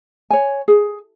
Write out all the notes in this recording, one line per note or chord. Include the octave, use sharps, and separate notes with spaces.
C#5 G#5
G#4